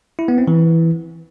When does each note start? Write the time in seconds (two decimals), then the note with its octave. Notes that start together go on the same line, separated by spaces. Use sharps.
0.19 E4
0.28 B3
0.38 C4
0.48 E3